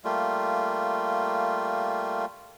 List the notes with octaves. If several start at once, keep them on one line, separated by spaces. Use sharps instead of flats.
G3 A3 A#3 F4